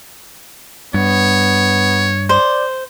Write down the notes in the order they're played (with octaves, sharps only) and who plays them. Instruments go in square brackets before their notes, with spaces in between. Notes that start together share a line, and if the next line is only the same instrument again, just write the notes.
[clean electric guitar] G2 [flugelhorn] B3 [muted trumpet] C#5
[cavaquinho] C5 [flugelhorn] D5